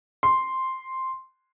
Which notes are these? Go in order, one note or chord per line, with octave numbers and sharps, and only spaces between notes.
C6